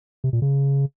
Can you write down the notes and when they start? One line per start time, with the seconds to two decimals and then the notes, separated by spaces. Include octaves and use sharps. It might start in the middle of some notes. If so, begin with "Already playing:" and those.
0.24 C3
0.33 A#2
0.42 C#3